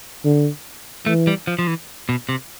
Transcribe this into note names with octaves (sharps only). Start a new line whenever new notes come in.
D3
E3 A3
G3
F3
F3
E3
B2
C3